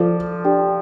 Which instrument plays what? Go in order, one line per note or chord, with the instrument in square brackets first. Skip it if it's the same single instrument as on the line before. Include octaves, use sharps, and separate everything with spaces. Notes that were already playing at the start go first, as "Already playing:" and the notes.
Already playing: [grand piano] F3 [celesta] A4 D5 A5 D6
[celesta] D4 G4 D5 G5